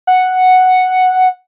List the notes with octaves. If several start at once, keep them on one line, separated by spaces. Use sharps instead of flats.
F#5